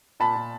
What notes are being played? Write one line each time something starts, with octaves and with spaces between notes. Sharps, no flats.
A#2 A5 B5
A#2